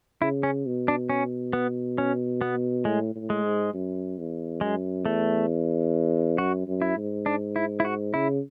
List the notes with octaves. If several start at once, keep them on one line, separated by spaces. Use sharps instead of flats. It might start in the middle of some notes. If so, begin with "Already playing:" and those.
C#3 E4
C#4
B2
D4
C#4
B3
C#4
B3
A2 G#3
A2
G#3
G#2
F#2
E2
F#2 G#3
E2 A3
F#2 F#4
F#2
E4
G#2
D4
E4
E4
F#4
C#3 E4